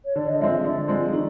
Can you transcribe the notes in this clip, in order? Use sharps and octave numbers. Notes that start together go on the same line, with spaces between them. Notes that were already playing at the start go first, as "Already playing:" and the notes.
C#5
D3 D5
D#5
F3 G#3 C4 E5
D3 D5
F3 G#3 C4
D#3